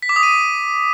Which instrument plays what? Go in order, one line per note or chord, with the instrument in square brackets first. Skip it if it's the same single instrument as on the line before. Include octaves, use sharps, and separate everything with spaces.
[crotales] B6
D6
D#6
D#7